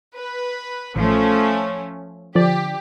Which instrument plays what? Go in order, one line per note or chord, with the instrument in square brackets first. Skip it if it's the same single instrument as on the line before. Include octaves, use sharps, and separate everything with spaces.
[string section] B4
[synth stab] A1 [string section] F3 A3 C#4
[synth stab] D3 F3 D5 [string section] G4